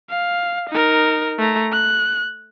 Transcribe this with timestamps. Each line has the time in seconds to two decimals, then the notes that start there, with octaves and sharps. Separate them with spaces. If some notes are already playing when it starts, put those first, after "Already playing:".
0.10 F5
0.70 D#4 A#4
1.39 A3 A#5
1.72 F#6